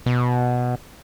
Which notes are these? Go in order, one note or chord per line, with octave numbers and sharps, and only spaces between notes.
B2